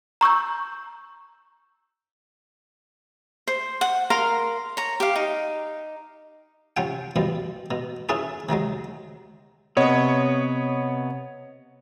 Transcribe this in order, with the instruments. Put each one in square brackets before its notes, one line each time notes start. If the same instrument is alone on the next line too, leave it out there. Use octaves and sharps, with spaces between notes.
[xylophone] A#5 C#6 E6 G6
[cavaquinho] C5
F#5
A#4 F5 A#5 C6
C#5 A#5
G4 F5
D#4
[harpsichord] C3 F3 C#4 F#5 G5
F#2 B2 F3 G3
B2
C#4 E4 F4 G#4 B4
C3 D#3 F#3 G#3
[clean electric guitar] C3 B3 [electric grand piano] C#5 D#5